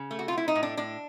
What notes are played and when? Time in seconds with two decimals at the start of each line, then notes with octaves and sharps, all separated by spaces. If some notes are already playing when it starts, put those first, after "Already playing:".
Already playing: C#3
0.11 A3
0.19 F#4
0.28 F4
0.32 A3
0.38 E4
0.48 D#4
0.55 A2
0.63 D4
0.77 A2 D4